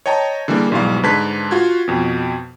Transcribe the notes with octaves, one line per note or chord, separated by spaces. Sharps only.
C#5 D#5 G5 A5 A#5
D3 E3 G3 A#3 G#4
B1 G#2 E3 G3 F5
G#2 D3 B4 A5 G#6 B6
F4 F#4 G#6
F2 B2